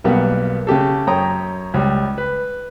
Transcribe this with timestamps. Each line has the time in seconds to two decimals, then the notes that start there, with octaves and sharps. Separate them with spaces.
0.04 B1 G3 A#3 B3 F#5
0.67 C#3 A3 G4 A4
1.07 F#2 C#5 G5 A#5 D#6
1.74 C#2 G3
2.18 B4